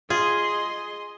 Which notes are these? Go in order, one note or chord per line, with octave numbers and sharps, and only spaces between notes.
F4 G#4 D#5 C6